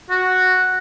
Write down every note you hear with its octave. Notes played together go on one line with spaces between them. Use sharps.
F#4